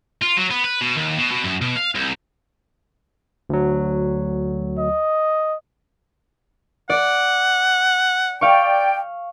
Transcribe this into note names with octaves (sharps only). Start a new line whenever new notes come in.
F4
F#3
B3
B4
B2
D#2
B2
B2
F#2
B2
F5
C2
D2 F#3
D#5
D5 F#5
D5 F5 G5 C#6